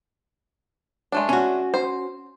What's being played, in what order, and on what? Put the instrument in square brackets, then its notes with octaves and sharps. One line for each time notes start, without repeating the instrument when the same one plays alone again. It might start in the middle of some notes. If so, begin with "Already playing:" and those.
[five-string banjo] G#3 A3 D4
[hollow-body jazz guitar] C#4 F#4
[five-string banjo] C5